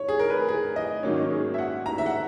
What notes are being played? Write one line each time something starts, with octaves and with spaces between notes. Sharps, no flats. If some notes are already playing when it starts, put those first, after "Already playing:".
Already playing: C#5
G#4
A#4
B4
G#4
D#5
G#2 D#3 F#3 A#3 C#4 C#5
G#4
E5
F#5
A#5
E5
F#5